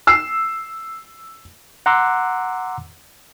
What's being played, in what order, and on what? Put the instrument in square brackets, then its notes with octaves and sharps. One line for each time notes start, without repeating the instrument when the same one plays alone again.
[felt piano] E6 C7
[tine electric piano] F#5 A#5 C6 D6 E6 F#6